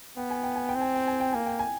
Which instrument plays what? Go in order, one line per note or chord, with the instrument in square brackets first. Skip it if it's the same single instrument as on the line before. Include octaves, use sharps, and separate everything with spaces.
[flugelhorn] B3 [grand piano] G5
[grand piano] G#5
G5
G#5
G5
[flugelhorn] C4
[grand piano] G#5
G5
G#5
G5
[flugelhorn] A#3 [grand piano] G#5
[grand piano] G5
G#5